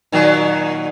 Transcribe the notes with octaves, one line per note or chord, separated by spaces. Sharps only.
A#2 D#3 F#3